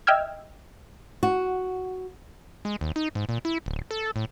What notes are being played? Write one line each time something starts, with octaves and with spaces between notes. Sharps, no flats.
D#5 E5 G5 E6 F6 G#6
F#4
G#3
D#2
D#4
G#2
A#2
E4
D1
A4
A2